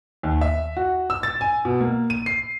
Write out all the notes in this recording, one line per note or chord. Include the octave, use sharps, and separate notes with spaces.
D#2
E5
F#4
E6
A6
G#5
B2
A#3
D#7
C7